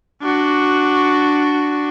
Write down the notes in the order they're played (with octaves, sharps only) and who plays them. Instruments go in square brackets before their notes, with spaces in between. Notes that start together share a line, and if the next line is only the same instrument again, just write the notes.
[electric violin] D4 F#4